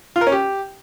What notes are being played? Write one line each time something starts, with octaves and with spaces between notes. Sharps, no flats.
F4
A#4
C#4
G4